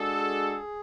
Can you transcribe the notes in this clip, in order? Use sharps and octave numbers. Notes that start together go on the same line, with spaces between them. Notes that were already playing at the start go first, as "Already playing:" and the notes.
Already playing: G#3 D4 F#4 G#4 A4